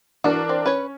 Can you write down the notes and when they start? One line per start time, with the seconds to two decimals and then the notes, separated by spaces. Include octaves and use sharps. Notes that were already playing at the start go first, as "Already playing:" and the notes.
0.24 E3 D4 F#4 A#4
0.49 C4
0.66 C#4 B4 C#5